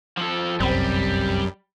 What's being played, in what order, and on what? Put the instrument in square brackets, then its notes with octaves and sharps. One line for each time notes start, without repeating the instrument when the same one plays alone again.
[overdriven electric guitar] F3 A4
[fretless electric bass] G1 C2 [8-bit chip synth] F#2 [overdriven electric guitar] G3 [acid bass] C4